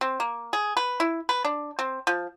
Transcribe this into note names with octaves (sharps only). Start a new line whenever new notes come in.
C4
A#3
G#4
B4
E4
B4
D4
C4
F3